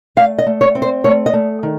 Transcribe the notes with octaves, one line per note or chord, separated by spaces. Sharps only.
A3 F5
D#5
A3
C#5
C4
C5
A3 C#5
D#5
A3
D#3